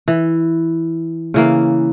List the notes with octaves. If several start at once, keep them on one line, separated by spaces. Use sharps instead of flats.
E3
C#3 E3 A#3